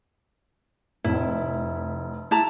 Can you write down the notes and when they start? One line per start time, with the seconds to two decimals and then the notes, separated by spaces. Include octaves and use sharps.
1.04 F1 E4
2.31 E4 A5 A#5